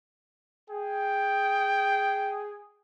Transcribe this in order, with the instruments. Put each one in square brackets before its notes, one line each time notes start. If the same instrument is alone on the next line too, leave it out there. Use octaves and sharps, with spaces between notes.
[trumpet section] G#4 [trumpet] G5